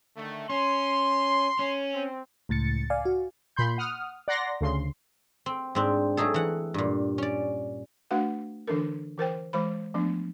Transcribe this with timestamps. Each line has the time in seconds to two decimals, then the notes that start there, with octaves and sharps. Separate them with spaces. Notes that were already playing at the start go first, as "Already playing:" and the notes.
0.17 D3 D#3 A3
0.49 C#4 C6
1.59 C#4
1.93 C4
2.49 C#2 A2 A6 C#7
2.90 D5 F5 G#5
3.05 F#4
3.56 A#2 B5 C6 G6
3.78 F#5 D#6 F6
4.28 D5 F#5 A#5 C6 A#6
4.61 D2 C#3 C6
5.46 C4
5.75 G#2 C4 D4
6.17 F#3 A3 D#4 G#4 A4
6.34 E3 F#5
6.74 G2 A#2
7.18 C#4 D5
8.11 A3 D4 F#4 B4 F5 F#5
8.68 D3 E3 D4 A4 A#4
9.18 E3 A#4 C5 G5
9.53 E3 G#3 C5 B5
9.94 F3 A3 B3 D4